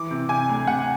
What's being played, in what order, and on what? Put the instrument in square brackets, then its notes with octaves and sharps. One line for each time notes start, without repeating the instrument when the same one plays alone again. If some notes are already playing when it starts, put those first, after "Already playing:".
Already playing: [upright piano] E3 D6
C3
C3 G#5
D2
C3 F#5